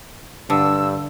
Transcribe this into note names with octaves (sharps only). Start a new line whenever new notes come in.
G2 D3 E6